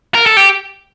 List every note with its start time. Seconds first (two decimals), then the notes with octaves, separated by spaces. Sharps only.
0.15 A#4
0.26 A4
0.37 G4